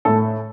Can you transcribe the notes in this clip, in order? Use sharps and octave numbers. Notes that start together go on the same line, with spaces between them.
A2 A4